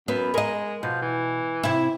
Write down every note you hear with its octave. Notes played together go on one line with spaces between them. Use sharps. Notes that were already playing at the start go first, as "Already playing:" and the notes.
F#2 B3
G#3 A#4 D#5
B2 F3
E3
C3 E4